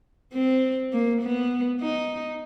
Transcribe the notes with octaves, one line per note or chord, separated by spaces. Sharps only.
C4
A#3
B3
D#4